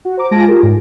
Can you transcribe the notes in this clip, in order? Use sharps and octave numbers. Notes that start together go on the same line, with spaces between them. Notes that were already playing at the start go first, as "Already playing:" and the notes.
F#4
C5 A#5 D6
G#3 F4 G#5 A5 A#6 D7
F4 G4 G#4 A#4
G#2